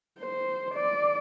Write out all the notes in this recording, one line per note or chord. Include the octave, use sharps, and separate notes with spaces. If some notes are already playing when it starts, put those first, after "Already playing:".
C5
D5